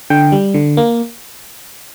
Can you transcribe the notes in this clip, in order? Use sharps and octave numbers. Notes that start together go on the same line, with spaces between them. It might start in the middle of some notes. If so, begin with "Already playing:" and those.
D3 G5
G3
D3
A#3